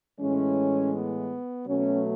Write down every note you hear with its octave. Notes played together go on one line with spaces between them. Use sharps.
A2 E3 G#3 C#4
B3
B2 F#3 A3 C#4